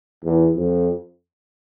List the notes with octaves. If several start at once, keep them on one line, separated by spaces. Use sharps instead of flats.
E2
F2